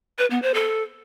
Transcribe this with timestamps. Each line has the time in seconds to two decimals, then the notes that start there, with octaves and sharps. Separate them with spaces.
0.19 B4
0.31 B3
0.42 C5
0.54 A4